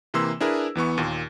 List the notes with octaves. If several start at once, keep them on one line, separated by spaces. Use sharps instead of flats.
C3 E3 A#3 C6 E6
D4 E4 G#4 A#4 B4
E2 E3 B3 C#6
D#2 A#2